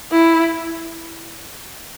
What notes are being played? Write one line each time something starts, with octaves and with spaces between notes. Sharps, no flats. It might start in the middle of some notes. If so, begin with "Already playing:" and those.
E4